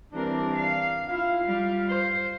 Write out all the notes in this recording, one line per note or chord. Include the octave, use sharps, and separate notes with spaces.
E3 G3 C4 D4 A#4
F5
E4 F4 F5
G3
C5